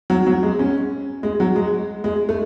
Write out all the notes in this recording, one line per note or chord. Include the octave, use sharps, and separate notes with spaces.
F#3
F#3
G#3
C#4
G#3
F#3
G#3
G#3
A3